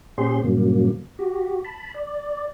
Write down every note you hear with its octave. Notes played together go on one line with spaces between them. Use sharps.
A#2 C#4 G4 G#4 C5 C6
G2 A#2 C#3 F#3 A#3
F#4 G4
A5 B5
D5